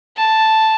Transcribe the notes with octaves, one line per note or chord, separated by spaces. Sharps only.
A5